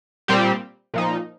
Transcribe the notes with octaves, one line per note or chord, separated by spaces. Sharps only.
A#2 G3 C4 G4
A#2 F3 D#4